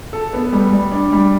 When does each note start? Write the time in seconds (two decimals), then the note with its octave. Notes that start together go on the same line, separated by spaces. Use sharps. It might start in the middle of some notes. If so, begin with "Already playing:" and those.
0.13 A4
0.33 B3
0.53 G3
0.72 G3
0.92 D4
1.12 G3